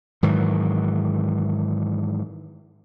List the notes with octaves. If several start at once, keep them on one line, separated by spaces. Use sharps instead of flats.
G#2 D#3 E3 F#3